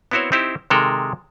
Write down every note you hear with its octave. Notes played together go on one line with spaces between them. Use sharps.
B3 C4 E4 F#4 C5 C#5
C4 D#4 E4 G4 C5
C3 D#3 G#3 A4 A#4